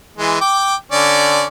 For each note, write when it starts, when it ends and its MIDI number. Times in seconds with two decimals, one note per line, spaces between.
0.17 0.37 52
0.17 0.37 56
0.41 0.75 79
0.41 0.75 86
0.92 1.45 50
0.92 1.45 61
0.92 1.45 74